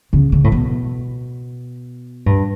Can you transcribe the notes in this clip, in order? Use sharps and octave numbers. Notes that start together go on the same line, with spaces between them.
C#3
C#3
A2
B2
G2